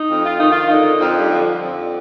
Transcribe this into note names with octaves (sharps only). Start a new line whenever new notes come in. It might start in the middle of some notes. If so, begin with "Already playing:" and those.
Already playing: D#4
F2
F4
D#3 D#4
F4
D3 D#4
F2 F3
G3
D3 F3
F2